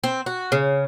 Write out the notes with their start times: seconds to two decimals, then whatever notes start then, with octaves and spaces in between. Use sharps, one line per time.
0.04 C4
0.26 F#4
0.52 C#3